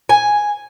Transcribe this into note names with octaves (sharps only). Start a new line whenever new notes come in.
G#5